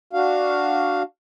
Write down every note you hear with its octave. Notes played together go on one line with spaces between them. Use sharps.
D4 F#4 F5